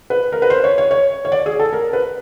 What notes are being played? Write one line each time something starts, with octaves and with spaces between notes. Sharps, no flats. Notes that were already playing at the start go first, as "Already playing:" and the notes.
B4
A#4
B4
C5
C#5
C#5
C#5
C#5
D5
G#4
A4
A#4
B4